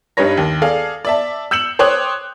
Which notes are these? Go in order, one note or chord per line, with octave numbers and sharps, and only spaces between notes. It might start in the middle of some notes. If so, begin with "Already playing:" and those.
G2 G3 D#4 B4 C#5 A#6
D#2
G#4 A4 D5 F5
D5 E5 A5
E6 G6 C#7 E7 F#7
C5 C#5 G5 D6 D#6 F#6